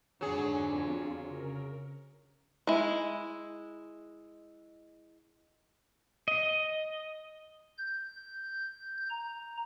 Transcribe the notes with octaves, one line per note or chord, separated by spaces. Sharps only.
F2 G#2 D3 F#3 F#4 G#4
F4
C#3 A#4
G#3 E4
D#5
G6
A#5